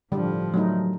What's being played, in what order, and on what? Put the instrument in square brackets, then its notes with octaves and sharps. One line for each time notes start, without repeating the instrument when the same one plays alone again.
[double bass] A2 F3 [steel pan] D3 G3
[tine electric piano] F#3 [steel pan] G3 A3 D#4